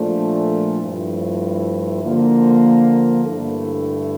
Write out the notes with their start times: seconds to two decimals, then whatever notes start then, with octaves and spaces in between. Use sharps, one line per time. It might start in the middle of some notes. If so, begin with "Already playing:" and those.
Already playing: A#2 F3 A3 D4
0.81 G2 F3 A3 E4
2.03 D3 F3 A#3
3.25 G2 D3 A3 E4 A4